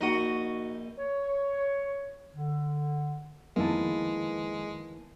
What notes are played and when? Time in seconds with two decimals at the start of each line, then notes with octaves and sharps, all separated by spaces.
0.01 A#1 D#4 F#4 D#5 D#6
0.98 C#5
2.34 D3
3.56 F2 D#3 G#3 A#3 E4 B4 A5